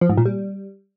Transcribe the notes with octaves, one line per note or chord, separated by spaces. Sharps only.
F3
G#2
A#2
G3